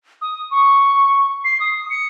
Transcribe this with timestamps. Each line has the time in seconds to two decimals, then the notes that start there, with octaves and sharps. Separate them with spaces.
0.21 D#6
0.51 C#6
1.44 C7
1.60 D#6
1.90 C#7